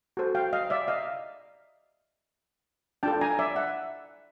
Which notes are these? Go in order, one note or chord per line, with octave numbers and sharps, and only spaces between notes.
F#4 A4 C5
F5 G5
D#5 F5
D5 E5
D#5 F5
D4 F4 A4 G5 A5
G#5 A#5
D5 E5
E5 F#5